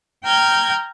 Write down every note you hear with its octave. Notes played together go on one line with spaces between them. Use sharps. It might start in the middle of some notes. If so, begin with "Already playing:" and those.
G5 A#5 F6 G6 G#6